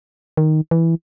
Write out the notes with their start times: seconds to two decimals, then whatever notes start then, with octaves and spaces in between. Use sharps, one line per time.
0.37 D#3
0.71 E3